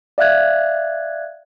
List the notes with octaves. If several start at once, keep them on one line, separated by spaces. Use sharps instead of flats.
D5 E5 F5 F#6 G#6